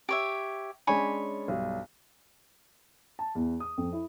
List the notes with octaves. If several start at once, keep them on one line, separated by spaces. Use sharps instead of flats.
G4 C#5 E5
G#3 C#4 D4 C#5 G#5 B5
B1 G2
A5
E2
D#6
F2
E4